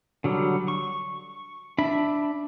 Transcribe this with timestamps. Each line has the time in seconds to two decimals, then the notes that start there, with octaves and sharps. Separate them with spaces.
0.24 D3 F#3 G3
0.68 C#6
1.78 D4 E5 B5